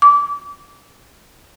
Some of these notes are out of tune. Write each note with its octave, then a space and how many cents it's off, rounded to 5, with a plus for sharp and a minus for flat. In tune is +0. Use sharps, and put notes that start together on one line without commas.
D6 -20